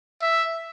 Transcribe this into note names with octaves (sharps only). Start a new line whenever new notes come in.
E5